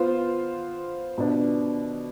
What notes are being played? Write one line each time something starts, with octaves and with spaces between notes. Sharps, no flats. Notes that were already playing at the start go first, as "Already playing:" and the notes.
Already playing: B3 F4 C5
B2 B3 D4